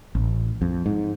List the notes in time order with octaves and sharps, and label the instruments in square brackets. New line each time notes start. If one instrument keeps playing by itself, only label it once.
[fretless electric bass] A1
F2
G#2